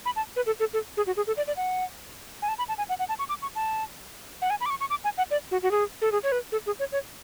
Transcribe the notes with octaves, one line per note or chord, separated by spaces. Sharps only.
B5
A5
B4
A4
A4
A4
G#4
F#4
G#4
A4
D5
D5
F#5
G#5
A5
B5
A5
G#5
F#5
F#5
A5
C#6
D6
C#6
A5
F#5
G#5
B5
D6
C#6
C#6
D6
G#5
F#5
D5
F#4
F#4
G#4
A4
G#4
C#5
B4
A4
G#4
C#5
C#5